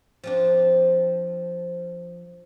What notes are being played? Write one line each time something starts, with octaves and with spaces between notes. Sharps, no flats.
F3 C4 D4